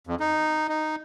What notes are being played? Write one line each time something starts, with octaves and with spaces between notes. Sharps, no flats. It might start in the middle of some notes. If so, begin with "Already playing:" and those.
F2
D#4
D#4